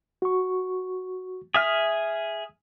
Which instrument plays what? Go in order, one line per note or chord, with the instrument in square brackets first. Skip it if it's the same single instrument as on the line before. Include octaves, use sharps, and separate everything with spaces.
[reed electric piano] F#4 C#6
[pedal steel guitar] G#4 E5 F6 [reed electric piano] D#6